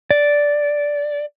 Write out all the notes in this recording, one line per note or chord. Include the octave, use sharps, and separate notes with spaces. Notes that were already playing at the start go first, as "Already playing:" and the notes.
D5